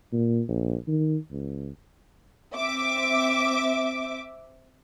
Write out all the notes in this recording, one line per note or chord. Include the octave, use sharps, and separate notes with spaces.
A#2
A#1
D#3
C#2
C4 E5 D6